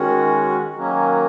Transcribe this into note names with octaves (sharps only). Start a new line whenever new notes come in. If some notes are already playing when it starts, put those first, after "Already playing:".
Already playing: D#3 G#3 C#4 F#4
D#3 F#3 A#3 C#4